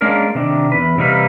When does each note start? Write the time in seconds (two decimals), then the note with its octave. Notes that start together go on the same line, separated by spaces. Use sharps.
0.01 G#3 A#3 C#4 D4 A#4
0.35 C3 D#3 D4
0.72 E2 B4
0.98 C3 E3 G3 A#3 D#4 B4